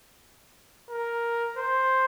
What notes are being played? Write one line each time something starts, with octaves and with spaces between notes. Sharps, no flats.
A#4
C5